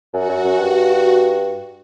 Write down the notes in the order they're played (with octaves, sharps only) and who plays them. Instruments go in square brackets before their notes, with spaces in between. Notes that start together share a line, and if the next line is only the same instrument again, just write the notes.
[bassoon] F#2 [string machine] F#4
[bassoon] F#2
F#2
G2